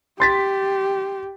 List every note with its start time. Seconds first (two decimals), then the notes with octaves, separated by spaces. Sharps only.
0.20 G4 C6 A6 B6